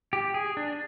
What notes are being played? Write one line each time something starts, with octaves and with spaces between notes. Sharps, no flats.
G4
G#4
D4